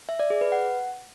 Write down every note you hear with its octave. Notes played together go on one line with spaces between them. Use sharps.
E5
D5
G#4
B4
F#5